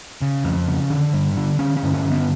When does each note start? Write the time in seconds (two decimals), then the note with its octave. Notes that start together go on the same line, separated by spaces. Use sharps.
0.22 C#3
0.45 F2
0.67 C#3
0.90 D3
1.13 G2
1.37 D3
1.59 D3 C#4
1.77 C#4
1.82 G2
1.94 C#4
2.05 D3
2.11 B3